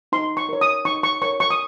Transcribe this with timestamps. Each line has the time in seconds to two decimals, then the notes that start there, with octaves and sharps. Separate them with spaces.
0.12 D#4 C6
0.37 C#6
0.49 A#4 C#5
0.61 D#6
0.85 D#4 C#6
1.03 C#6
1.22 A#4 C#5 C#6
1.40 C#6
1.50 D#6